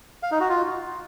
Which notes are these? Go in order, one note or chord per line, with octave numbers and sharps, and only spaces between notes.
F5
D#4
F#4
F4